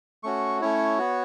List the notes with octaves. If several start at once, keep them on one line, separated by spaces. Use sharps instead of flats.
A3 C#4 F#4 C#6
A3 C#4 E4 C#5
B3 F#4